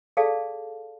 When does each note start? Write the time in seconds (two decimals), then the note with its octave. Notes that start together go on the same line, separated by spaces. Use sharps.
0.17 G#4 A4 D5 F5 A5